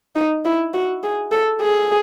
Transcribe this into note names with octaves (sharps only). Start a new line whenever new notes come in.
D#4
E4
F#4
G#4
A4
G#4